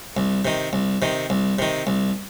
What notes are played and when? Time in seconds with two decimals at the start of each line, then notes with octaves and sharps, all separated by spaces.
0.17 C2
0.45 C3 D#3
0.73 C2
1.02 C3 D#3
1.30 C2
1.59 C3 D#3
1.87 C2